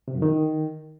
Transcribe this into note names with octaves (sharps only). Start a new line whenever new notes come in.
C3
F#2
D#3